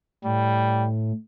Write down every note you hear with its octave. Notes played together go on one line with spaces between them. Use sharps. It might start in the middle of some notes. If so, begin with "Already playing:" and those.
A2 G3